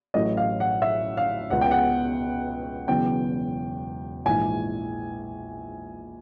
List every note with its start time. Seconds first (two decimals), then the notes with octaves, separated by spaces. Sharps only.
0.14 A1 A2 F#3 A3 D#5
0.37 F5
0.60 F#5
0.82 E5
1.17 F5
1.50 C#2 B2 G#3 B3 F#5
1.61 G5
1.71 F#5
2.88 E1 E2 C#3 F#3 B3 G5
4.25 A#1 G#2 E3 G#5